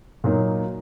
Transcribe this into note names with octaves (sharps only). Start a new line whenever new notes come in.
A#2 F#3 A#3 D#4